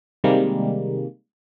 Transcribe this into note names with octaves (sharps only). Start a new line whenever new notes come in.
C3 D#3 G3 G#3 A#3